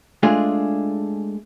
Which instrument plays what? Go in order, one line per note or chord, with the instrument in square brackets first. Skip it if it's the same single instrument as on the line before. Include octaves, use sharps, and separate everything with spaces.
[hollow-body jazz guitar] G#3 A3 D4 F4 G#4